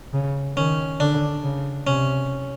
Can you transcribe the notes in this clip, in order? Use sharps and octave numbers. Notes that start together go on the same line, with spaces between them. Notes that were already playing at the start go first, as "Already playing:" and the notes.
C#3
D#3 C#4
D3 D4
C#3
C3 C#4